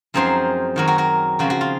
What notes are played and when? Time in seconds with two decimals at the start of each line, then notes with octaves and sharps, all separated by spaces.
0.14 F#2 F3 G#3 C4 D#4 G#4 C5
0.76 D#3 F#3 C4 F#4 A#4
0.88 F#4 A#4
0.98 F#4 A#4
1.39 C#3 F3 G#3 C4 F#4
1.50 F#4
1.61 F4